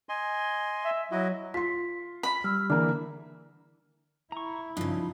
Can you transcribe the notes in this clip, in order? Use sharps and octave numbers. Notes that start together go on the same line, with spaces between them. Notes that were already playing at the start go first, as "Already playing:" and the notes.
D#5 G#5 C6
E5
F#3 E4 F#4 D#5
F4 C6 B6
B5 B6
G3 E6 F6
D3 E3 A#3 D4 F6
E4 A#5 C#6
G2 C#3 F3 D#4